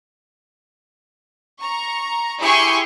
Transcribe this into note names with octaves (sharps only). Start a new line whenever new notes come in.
A#5 C#6
E4 G4 G#4 G#5 C6 C#6